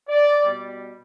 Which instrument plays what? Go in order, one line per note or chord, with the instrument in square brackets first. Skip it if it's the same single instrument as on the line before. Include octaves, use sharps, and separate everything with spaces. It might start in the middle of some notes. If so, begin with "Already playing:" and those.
[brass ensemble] D5
B2 G3